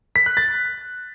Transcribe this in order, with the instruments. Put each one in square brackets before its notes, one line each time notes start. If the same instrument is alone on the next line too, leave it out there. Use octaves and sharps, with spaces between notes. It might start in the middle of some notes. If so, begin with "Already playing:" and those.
[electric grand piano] B6
F#6
A6